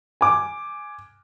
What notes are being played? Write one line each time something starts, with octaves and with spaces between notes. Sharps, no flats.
G#5 D6